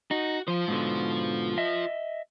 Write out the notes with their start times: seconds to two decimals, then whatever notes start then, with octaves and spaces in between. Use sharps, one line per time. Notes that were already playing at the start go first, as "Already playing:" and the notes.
0.11 D#4 F#4
0.48 F3 F4 C5
0.68 G#2 B2 D3
1.58 D#5 E5